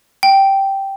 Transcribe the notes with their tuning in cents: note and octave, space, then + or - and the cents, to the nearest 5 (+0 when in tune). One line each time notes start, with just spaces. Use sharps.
G5 -5